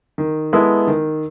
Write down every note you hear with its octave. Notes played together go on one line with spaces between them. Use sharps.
D#3
G#3 B3 E4 A4
D#3